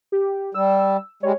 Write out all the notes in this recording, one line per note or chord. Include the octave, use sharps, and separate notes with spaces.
G4
G3 E6
G3 G#3 C#5